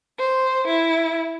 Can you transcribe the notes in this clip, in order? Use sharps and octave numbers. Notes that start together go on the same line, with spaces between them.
C5
E4